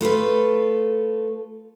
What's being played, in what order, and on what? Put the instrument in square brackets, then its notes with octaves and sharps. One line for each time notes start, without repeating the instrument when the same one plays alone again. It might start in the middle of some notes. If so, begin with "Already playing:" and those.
[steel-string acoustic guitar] A3 F4 A4 B4